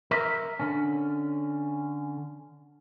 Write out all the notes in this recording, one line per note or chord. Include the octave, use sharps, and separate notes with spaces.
A#4 E5
D3 C#4